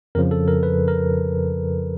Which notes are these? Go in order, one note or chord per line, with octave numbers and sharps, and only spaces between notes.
F2 C#3 F3 A#4
A4
A#4
B4
A#4